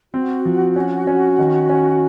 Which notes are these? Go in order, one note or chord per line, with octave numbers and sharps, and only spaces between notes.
C4 F#4
F3
C#4
C#4
D#3
C#4